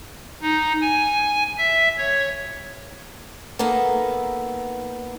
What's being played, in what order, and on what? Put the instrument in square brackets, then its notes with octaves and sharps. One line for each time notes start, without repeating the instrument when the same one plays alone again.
[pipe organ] D#4
G#5
E5
C#5
[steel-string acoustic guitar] A#3 B3 D#4 A4